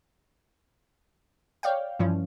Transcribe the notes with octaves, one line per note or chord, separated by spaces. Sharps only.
C#5 D5 F5 G5
G2 E3 F3 C#4